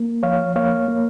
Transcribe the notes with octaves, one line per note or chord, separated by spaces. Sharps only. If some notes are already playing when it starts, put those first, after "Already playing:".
Already playing: A#3
F3 C#5 F5
A#3 C#5 F5
A#3